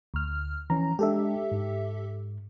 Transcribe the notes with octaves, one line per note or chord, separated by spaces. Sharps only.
D2 F6
E3 F3 C#4 A#5
G#3 D4 G4 A4 E5
G#2